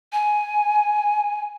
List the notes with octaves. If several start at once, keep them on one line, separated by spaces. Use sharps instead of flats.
G#5